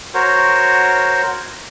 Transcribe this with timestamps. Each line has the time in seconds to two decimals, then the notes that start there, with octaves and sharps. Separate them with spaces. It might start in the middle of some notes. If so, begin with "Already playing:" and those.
0.14 F#4 A#4 C5 C#5